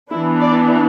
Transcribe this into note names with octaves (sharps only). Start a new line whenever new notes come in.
E3 B3 D4 E4
D5